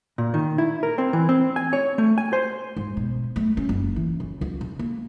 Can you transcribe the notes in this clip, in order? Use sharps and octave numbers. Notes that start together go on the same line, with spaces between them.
A#2
D#3
E4
A#4
C4
E3
C4
G#5
C#5
A3
G#5
C5
G#2
B2
A3
C#4
F#1
E3
C#3
C#2
C#3
A#3